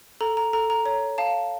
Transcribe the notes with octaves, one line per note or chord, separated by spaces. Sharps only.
A4 A#5
A#5
A4 A#5
A#5
C#5 A#5
F5 A5